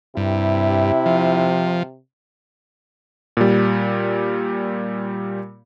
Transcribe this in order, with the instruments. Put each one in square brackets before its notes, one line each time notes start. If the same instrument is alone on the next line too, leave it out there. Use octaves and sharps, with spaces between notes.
[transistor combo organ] G2 [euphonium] C3 [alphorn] E4
[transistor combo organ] F3
[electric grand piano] A#2 G3